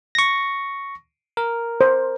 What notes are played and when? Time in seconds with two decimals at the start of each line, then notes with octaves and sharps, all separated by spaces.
0.15 C#6 A#6
1.37 A#4
1.81 C5